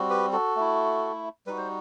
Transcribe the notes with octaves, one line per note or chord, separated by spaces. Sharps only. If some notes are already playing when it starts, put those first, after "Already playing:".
Already playing: G3 C4 F#4
G4 B4
F#4 A4
A3 E4
G3 D#4 F#4 B4
C5